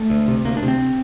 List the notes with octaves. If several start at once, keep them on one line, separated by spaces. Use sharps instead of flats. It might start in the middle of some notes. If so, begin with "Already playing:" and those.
Already playing: A3
D2
C3
D2 A#3
D4
C3
C4